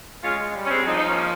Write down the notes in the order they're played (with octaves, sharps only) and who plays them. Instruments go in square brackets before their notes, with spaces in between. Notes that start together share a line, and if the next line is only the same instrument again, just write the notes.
[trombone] G#3 [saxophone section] C#4 F4
[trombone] G3
[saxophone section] C#4
G#3 C4
[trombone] F3 [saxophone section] C4 D#4
[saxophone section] D#4
A#3 C#4